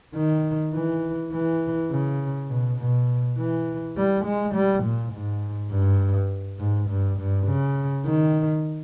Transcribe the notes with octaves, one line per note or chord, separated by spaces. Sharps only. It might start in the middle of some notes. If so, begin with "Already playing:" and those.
D#3
E3
E3
C#3
B2
B2
E3
G3
G#3
G3
A#2
G#2
G2
G#2
G2
G2
C#3
D#3